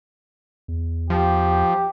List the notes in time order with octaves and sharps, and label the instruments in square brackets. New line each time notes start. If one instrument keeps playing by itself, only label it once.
[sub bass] E2
[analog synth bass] F3 [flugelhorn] G4